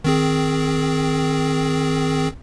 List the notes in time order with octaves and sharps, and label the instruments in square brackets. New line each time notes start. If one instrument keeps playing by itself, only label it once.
[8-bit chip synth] D#3 C4 G#4